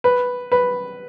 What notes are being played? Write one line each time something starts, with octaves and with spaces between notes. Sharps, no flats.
B4
B4